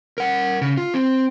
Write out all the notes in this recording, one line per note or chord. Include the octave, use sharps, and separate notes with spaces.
A#4 F#5
C#3
F4
C4